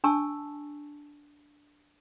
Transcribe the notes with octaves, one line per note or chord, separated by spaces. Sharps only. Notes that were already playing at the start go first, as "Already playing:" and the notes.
D4 G#5 A5 C#6 E6